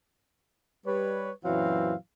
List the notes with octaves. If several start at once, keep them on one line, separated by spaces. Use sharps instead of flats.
G3 B4 C#5
F#2 A#2 E3 F#3 C4 F5